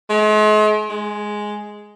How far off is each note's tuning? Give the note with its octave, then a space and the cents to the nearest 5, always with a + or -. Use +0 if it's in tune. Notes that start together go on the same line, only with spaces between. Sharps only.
G#3 +45
G#3 +5